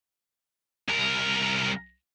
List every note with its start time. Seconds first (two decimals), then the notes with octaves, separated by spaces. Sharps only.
0.88 C2 A#4